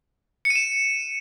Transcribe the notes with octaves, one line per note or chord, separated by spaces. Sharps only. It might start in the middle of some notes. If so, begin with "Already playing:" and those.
C#7
D#7
E7